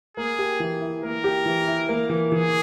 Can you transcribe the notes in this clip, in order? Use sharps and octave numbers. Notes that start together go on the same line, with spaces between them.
A#3 G#4
G4
E3
E4
A#3 A#4
G4
E3
E4
A#3
E3
E3 G#4